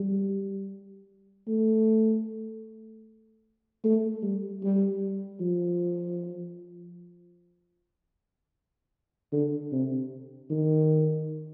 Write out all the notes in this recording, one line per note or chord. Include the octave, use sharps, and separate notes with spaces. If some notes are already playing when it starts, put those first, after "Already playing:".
Already playing: G3
A3
A3
G3
G3
F3
D3
C3
D#3